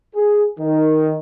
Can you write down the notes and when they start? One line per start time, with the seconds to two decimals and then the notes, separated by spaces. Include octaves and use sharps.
0.15 G#4
0.59 D#3